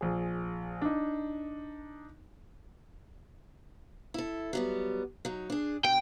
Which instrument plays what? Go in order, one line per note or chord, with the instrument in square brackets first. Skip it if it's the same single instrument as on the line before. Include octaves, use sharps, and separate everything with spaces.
[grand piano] A#1 G#4
D4 D#4
[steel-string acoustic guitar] E4 A4
F#3 G3 B3
F#3 D#4
D4 G#4
[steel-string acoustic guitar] B2 [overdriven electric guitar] G5